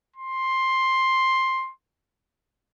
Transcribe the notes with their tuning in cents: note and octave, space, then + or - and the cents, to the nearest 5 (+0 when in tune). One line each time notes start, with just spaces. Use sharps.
C6 +10